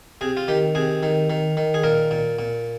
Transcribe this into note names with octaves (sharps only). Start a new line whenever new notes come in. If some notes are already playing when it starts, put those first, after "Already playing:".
C3 G#4
F4
D#3 G4
C3 G#4
D#3
D#3
D#3
G#4
A#2 A#4
A#2
A#2